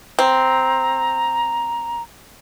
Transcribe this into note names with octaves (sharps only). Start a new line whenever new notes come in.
C4 A#5